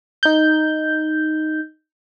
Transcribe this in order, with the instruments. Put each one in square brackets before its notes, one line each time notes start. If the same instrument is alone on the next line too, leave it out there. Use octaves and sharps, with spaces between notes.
[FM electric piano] D#4 G6